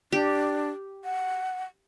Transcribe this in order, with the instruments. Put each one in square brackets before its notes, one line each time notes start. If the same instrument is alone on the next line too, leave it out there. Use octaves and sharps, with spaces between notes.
[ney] D4 [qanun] G4
[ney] F#5